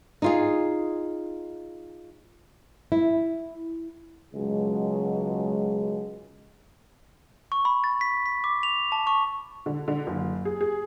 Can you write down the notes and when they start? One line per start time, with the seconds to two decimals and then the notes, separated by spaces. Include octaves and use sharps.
0.22 D#4 F4 G#4
2.92 E4
4.33 C#2 B2 F#3 G#3
7.52 C#6
7.65 B5
7.84 A6
8.01 B6
8.26 B6
8.44 D6
8.63 F7
8.92 A5
9.07 C#6
9.66 D3
9.88 D3
10.07 F#1
10.45 G#4
10.61 G#4